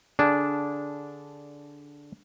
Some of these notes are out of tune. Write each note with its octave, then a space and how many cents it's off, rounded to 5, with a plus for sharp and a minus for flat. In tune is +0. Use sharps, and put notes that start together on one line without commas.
D3 -10 D4 -10 G#4 +0